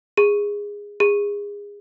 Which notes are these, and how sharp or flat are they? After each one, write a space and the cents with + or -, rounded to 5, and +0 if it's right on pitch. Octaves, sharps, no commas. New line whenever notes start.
G#4 -15
G#4 -25